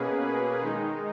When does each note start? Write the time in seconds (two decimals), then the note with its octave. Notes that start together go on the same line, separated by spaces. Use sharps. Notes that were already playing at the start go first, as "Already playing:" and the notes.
Already playing: B2 A#3 C#4 G#4 B4
0.62 D#3 G#3 D#4